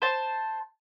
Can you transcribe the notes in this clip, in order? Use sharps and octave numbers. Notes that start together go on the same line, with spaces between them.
C5 A5